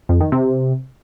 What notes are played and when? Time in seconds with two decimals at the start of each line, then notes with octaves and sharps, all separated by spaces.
0.09 F2
0.21 D#3
0.32 C3